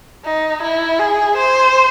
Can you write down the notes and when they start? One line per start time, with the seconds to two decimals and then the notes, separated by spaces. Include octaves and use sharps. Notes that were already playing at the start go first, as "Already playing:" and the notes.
0.25 D#4
0.62 E4
0.99 G#4
1.37 C5